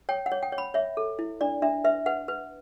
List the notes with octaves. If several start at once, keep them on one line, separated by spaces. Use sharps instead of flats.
C#5 G5
F#5
C#5
G5
C#5
B5
C#5 E5
A4
E4
D4 D5
D4 E5
B4 E5
B4 F#5
B4